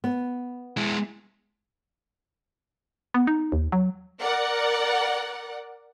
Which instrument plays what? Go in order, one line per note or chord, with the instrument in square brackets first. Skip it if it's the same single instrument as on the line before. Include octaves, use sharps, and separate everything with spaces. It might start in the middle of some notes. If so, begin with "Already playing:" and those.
[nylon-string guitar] B3
[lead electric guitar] G#3 E4
[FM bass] B3
D#4
D#2
F#3
[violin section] A#4 D5 F#5